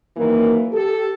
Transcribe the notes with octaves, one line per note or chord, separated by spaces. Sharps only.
F#2 D#3 E3 A#3
G4 A4